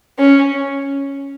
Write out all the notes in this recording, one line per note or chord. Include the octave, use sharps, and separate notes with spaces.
C#4